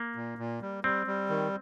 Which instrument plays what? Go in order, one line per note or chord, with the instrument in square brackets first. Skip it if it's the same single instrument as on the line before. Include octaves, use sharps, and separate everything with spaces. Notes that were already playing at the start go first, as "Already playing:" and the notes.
Already playing: [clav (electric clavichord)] A#3
[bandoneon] A#2
A#2
G3
[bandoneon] G3 [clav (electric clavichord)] C4
[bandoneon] G3
D#3